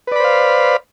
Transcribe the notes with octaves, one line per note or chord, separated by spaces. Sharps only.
B4 C5 D5 F5 B5